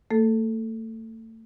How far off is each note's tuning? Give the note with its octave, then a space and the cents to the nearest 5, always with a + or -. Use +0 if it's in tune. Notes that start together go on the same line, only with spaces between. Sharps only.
A3 +35 A4 -5